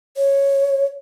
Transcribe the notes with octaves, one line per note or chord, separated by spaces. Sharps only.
C#5